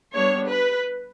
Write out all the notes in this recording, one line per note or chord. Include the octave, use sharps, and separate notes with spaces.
G3 B3 D4 C#5
B4